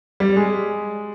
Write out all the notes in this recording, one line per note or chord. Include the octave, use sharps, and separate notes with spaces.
G3
G#3